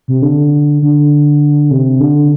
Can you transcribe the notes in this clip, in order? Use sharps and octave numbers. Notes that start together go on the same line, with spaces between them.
C3
D3
D3
C3
D3